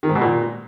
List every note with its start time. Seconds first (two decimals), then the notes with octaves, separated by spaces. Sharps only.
0.03 D#3
0.09 G#2
0.15 B2
0.21 A#2